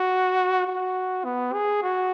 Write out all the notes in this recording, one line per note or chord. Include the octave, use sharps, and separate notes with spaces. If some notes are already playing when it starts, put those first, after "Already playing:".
Already playing: F#4
F#4
B3
G#4
F#4